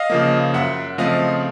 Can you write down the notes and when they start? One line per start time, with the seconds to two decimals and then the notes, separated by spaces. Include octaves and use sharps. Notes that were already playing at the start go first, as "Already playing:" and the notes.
Already playing: D#5 F5
0.10 C#3 F3 A#3
0.54 F#2 E5 F#5
0.98 C#3 F3 A3 C4 D#5 F5